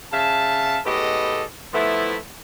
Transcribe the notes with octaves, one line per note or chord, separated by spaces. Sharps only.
C#3 E5 F5 A5
A2 G#3 B3 G4 A4 D#5
F3 A3 B3 E4